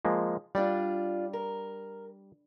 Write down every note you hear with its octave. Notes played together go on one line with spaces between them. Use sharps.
F3 G#3 A#3
G3 D4 F4 D5
A#4